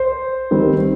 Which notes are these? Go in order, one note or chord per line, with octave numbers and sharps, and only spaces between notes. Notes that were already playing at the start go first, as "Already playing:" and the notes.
Already playing: C5
D#3 G3 C4